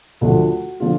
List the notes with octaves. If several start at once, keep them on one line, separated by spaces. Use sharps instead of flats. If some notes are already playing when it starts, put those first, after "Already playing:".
D2 D3 F3 F#4
D3 F3 F4